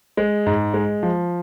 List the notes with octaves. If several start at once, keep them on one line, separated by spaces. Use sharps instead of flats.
G#3
G#2
G#3
F3